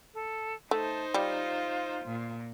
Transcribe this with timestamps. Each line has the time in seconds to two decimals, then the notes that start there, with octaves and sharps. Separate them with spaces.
0.14 A4
0.71 A3 D#4 C5 A5
1.14 G3 F4
2.04 A#2